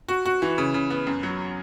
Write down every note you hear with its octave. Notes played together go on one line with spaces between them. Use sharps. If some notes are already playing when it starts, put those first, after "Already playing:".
F#4
F#4
E3
C#3
C#3
B3
F#2
F#3